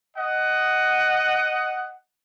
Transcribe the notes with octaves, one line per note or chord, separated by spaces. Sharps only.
D#5 F#5